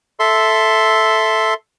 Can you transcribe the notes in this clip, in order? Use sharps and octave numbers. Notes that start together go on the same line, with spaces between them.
A4 E5 C6